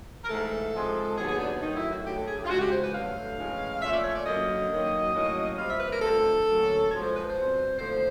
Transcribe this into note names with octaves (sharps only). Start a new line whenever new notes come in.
A#4
G#2 E3 A3 A4
G#2 F3 G#3 C4
D#2 D#3 F#3 B3 G#4
G#4
D4
F#2 D#3 F#3 A3 D#4
E4
F#4
D2 D3 F#3 A3 G4
A4
G#4
G4
F4
F2 C#3 E3 G#3 F#4
G4
C5
B4
G2 D3 F#3 A3 F5
A2 E3 G#3 C#4
A#2 F3 A3 C#4 E5
D5
C#5
D5
F#2 D3 F#3 A#3 D#5
F#2 D#3 F#3 A#3
A2 F#3 A#3 C#4
A#2 G3 C4 F5
E5
B4
A#4
F2 D3 F3 A3 A4
D2 D3 F#3 A#3 C#4
G#2 F3 G#3 C#5
C5
B4
C5
B2 G3 C4
D#2 D3 F3 A3 C5